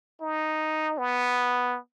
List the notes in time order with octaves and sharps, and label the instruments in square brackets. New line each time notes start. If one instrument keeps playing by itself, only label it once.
[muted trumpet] D#4
B3